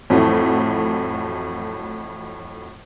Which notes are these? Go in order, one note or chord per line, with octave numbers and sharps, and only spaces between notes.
F2 A2 E3 F#3 A3